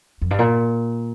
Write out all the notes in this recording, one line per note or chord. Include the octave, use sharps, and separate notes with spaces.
F2
G2
A#2